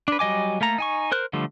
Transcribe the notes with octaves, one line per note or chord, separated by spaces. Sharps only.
D4 B4
F#3 G3 D#5 G#5 D6
A3 A#3 A4 A#5
D#4 G#5 C#6
A#4 C5 F#6
D3 F3 G3 A3